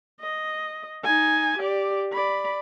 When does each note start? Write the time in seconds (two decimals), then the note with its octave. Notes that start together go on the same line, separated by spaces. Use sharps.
0.21 D#5
1.04 D#4 G#5
1.58 G4 D5
2.13 D5 B5